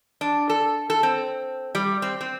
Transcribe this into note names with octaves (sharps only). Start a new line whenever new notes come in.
D4
A4
A4
C4
G3
C4
C4